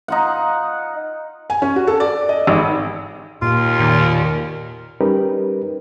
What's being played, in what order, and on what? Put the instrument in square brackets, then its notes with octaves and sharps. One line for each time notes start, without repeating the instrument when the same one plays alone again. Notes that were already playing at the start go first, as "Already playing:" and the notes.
[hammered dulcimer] D#4 F4 F#5
[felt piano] G#5
C#4
F#4
A4
D5
D#5
G#1
[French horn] D#2 [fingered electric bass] A#2 [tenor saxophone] F4
[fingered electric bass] E1 D#3 [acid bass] A#2
[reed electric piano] G3 C#4 D#4 G4 A#4 B4